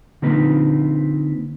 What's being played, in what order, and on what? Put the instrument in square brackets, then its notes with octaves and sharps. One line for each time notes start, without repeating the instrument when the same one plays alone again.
[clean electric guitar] D3 A#3 C4 D#4 F4 B4